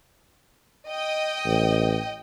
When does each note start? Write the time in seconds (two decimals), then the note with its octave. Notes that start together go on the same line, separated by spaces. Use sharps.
0.90 D#5 G5
1.45 A1